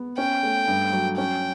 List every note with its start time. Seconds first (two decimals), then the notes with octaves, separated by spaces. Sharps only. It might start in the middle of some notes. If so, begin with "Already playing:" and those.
Already playing: B3
0.17 C#4 G5
0.43 A3
0.68 G2
0.93 F#3
1.18 C#4 G5